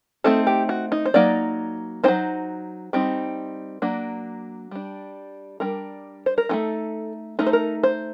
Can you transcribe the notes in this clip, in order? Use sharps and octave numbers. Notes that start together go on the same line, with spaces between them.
A3 C4 D#4 A4
G4
F#4
D#4
C5
F#3 A#3 D#4 D5
F#3 C4 D#4 C5
G3 C4 D#4
F#3 A#3 D4
G3 D4
G3 D4 A#4
C5
A#4
A3 C4 D#4 A4
A3 D#4 A#4
C5
A#4
C5